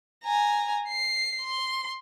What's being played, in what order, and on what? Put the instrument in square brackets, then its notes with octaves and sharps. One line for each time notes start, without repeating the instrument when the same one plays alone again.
[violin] G#5 A#5
C7
C6